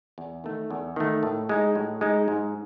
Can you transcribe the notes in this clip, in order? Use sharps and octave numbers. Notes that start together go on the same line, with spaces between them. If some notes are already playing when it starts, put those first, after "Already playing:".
E2
D#3 A3
E2
D#3 A3
A2
G#3 D#4
A2
G#3 D#4
G#2